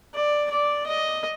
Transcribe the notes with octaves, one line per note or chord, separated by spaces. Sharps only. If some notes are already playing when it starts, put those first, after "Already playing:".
D5
D5
D#5